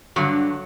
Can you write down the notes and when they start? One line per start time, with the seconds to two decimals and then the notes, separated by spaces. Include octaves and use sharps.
0.16 G2 D3 F#3